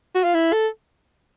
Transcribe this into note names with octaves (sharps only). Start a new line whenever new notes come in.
F#4
F4
E4
A4